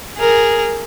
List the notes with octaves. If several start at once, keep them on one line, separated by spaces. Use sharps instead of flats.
G#4 A#4